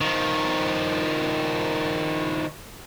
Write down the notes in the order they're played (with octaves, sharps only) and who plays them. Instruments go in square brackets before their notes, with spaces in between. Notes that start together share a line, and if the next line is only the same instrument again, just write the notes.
[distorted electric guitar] D#3 F3